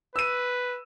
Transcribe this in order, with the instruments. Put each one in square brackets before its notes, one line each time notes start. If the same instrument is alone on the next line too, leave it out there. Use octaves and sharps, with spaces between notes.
[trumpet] B4 [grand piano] E6 D#7